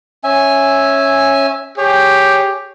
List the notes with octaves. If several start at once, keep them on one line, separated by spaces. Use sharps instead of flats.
C#4 E5 G#5
G4 G#4 C#5